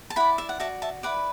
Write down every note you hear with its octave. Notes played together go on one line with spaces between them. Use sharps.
A5
E4 D5 F#5 B5
E5
F#5
F#4 D5 E5 A5
E5 A5
E4 B4 D5 F#5